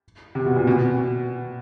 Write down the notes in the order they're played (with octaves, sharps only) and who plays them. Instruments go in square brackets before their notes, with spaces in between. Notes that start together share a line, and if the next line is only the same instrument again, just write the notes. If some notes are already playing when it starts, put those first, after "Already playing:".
[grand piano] C3
B2
A#2
B2